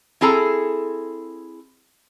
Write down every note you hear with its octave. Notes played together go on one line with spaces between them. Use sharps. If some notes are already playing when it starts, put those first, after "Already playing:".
C4 E4 G#4 A4 A#5